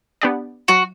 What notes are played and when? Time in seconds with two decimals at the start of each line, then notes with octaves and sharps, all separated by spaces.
0.21 B3 D4 G4 D5
0.68 F#3 F#4